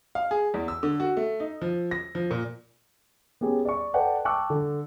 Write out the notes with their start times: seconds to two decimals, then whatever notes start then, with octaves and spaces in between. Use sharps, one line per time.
0.15 F5
0.31 G#4
0.54 E2
0.68 E6
0.83 D3
1.00 F#4
1.17 A3
1.40 D#4
1.62 F3
1.91 A#6
2.15 F3
2.31 A#2
3.41 B3 C#4 G4 G#4
3.65 D5 C#6
3.94 A4 B4 D5 F#5 G5 A5
4.25 G5 A5 C#6 D6 E6 F#6
4.50 D3